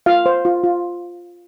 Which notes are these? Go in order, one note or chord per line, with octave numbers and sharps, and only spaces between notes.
F4 F5
C5
F4
F4